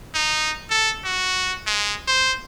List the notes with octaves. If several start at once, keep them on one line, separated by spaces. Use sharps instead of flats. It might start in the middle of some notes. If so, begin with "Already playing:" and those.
D#4
A4
F#4
G#3
C5